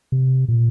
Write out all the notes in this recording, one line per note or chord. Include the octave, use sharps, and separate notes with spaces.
C3
A#2